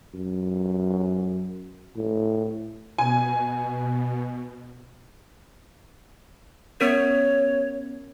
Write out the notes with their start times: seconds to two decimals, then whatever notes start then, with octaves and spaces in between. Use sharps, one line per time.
0.14 F#2
1.96 A2
2.98 B2 G#5
6.81 B3 C#4 A#4 C#5